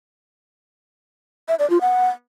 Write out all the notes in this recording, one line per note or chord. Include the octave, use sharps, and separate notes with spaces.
E5
D5
F4
F#5